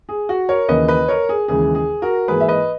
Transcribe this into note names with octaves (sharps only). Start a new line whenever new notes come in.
G#4
F#4
A#4 C#5
D#2 C#3 E3 A#3 B4 D#5
B4 D#5
A#4 C#5
G#4
D#2 C#3 E3 G#3 G#4
G#4
F#4 A#4
G#2 E3 A#3 G#4 B4
E5
B4 D#5